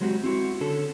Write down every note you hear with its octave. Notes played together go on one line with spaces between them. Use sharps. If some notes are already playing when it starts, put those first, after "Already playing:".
F#3 G#3 C4 F#4 G4
C4 E4 F#4
D3 C#4 A4